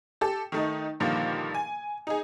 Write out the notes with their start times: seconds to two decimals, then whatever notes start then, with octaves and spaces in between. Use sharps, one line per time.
0.21 G4 A4
0.52 D#3 A3 D#4
1.00 G2 A#2 D3 D#3 F3 A#3
1.55 G#5
2.07 D#4 G#4